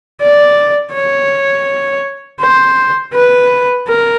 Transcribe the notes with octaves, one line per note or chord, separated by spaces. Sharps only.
D5
C#5
C5
B4
A#4